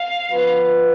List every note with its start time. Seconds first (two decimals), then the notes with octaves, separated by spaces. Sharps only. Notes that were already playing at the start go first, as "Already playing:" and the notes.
Already playing: F5
0.30 F3 B3 F4 B4